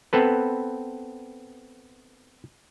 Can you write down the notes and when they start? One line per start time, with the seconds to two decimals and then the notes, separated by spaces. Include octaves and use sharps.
0.13 B3 C4 A4 B4